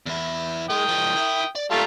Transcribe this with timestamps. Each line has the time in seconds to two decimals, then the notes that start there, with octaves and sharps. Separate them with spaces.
0.06 E2 E4
0.70 G#3 G5 D#6
0.88 F3 G#3
1.16 E4
1.56 D5
1.71 G3 A3 F4 A5 A#5